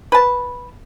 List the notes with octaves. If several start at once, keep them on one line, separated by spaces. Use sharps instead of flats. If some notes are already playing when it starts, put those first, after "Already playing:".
B4 A5